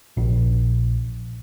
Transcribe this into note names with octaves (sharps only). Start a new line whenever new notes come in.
A#1